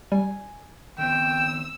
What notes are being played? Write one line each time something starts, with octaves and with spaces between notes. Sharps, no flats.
G3 G#5
D#3 B3 C4 G5 E6